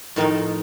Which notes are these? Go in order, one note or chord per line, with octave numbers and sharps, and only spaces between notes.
A2 D#3 F3 C4 D#4 A4